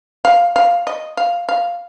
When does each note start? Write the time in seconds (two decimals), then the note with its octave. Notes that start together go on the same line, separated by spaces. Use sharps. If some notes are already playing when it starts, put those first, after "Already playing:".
0.25 F5
0.56 F5
0.87 D#5
1.17 F5
1.49 F5